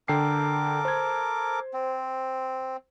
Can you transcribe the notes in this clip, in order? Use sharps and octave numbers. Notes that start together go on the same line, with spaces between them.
D3 A4 A#4 G5 D6 C7
C5 G#6
C4